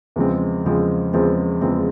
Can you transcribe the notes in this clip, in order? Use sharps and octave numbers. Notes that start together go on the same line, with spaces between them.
E2 C#3 F3 G#3 C4
E2 C#3 F3 G#3 C4
E2 C#3 F3 G#3 C4
E2 C#3 F3 G#3 C4